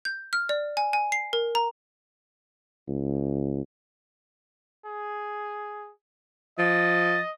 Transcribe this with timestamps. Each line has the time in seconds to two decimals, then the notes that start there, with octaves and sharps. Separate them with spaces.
0.05 G6
0.33 F6
0.49 D5
0.77 G#5
0.93 G#5
1.12 C7
1.33 A#4
1.55 A#5
2.88 C#2
4.85 G#4
6.59 F3 D#5 A6